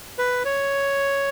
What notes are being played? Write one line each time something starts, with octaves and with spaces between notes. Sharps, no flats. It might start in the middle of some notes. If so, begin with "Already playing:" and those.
B4
C#5